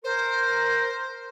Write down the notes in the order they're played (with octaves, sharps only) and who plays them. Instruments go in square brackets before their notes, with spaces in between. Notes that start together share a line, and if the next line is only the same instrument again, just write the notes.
[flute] A#4 [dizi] C5